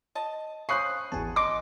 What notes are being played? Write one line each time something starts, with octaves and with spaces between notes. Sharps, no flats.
D#5 A5
C#4 C5 F5 B5 C#6 D#6 F#6 C7
G#1 E2 G#5 A5
D#5 C6 D6 D7